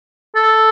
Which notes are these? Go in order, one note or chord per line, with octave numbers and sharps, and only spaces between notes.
A4